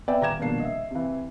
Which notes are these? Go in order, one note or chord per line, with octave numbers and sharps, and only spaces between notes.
B3 B4 D5 E5 G5 G#5
D#1 A#5 D6 G#6 E7
D#1 B2 F3 A#3 D4 C7
D#5 E5
C3 E3